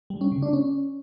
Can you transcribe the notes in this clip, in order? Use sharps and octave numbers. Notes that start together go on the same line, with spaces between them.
G3
C#4
C#3
D4
C#4